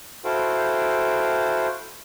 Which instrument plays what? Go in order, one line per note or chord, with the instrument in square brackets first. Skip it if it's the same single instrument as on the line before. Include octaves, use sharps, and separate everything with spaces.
[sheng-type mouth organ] E4 F#4 A4 C5 F5 G5